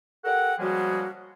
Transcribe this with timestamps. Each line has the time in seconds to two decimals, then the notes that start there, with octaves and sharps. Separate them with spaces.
0.25 G4 A4 A#4 F#5
0.59 C#3 F3 G3 G#3 A#3 F#4